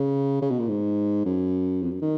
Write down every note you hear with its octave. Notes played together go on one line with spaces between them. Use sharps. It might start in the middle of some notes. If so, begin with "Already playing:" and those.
Already playing: C#3
C#3
B2
A#2
G#2
F#2
F2
F#2
D#3